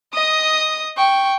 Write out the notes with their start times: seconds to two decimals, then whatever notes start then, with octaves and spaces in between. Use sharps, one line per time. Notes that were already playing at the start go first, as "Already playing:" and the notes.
0.13 D#5 D#6
0.97 G5 C#6